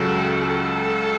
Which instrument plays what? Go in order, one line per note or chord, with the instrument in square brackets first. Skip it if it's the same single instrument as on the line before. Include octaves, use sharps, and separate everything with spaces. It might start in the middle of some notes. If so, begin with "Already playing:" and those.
Already playing: [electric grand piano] C#2 C#3 F#3 [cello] A4
[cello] A4